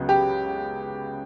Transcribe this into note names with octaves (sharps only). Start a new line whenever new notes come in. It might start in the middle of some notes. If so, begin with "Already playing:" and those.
Already playing: C#2 C#3 F#3 B3
G4